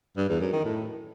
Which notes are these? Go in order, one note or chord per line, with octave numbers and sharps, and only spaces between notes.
G2
E2
F#2
D#3
A2